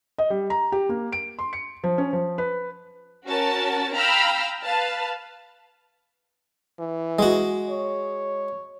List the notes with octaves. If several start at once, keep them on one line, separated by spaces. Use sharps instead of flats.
D#5
G3
A#5
G4
A#3
D7
C6
C#7
F3
C#4
F3
B4
C#4 F#4 A#4 A5
F5 G5 A#5 B5 E6 F6
B4 F5 A5
E3
G#3 F#4
C#5